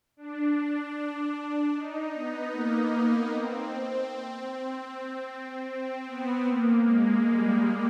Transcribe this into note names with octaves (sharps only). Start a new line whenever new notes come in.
D4
D#4
B3
A#3
A#3
C4
C4
B3
A#3
G#3
G3